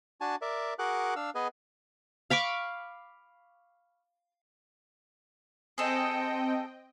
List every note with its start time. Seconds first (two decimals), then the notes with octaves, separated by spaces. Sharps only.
0.21 D4 F#4 G#5 A5
0.42 A#4 D5 E5
0.79 F#4 G#4 A#4 F#5 D6 F#6
1.16 D4 F5 E6
1.35 B3 G#4 B4 D#5 G#5
2.30 F5 B5 C#6 D6
5.78 C4 G#4 A4 D#5 G5